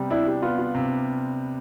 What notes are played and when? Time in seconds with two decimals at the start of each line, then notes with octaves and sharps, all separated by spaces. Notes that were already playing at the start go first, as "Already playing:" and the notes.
Already playing: C3 G3 B3
0.10 D4 E4
0.27 G4
0.42 B3 F4
0.58 F4
0.75 C3